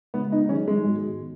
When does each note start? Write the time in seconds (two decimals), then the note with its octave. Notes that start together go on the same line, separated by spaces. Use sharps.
0.14 C#3 G#3 B3 D#4
0.32 D#4
0.49 D#3 F#3 C#4 D#4 G#4
0.68 G#3
0.86 G#2 D#3 B3 F#4
1.20 D#3